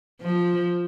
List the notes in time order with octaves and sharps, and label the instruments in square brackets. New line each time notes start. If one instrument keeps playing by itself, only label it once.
[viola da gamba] F3